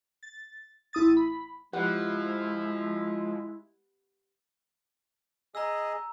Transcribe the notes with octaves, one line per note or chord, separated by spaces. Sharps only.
A6
A1 E4 D#6 A6
B5
F3 G#3 E4 G4 B4 F#5
G#4 D#5 A#5 E6